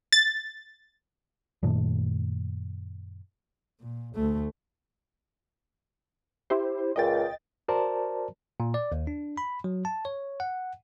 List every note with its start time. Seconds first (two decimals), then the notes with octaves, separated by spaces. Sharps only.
0.13 A6
1.63 F#2 A#2 D#3 A3
3.79 A#2
4.15 D2 A3
6.50 E4 G4 C5
6.96 C#2 A#2 D#5 G5 A6
7.68 F#4 A#4 C5 D5 A5 A#5
8.60 A#2
8.74 D5
8.92 D#2
9.07 D4
9.37 B5
9.64 F#3
9.85 A5
10.05 C#5
10.40 F#5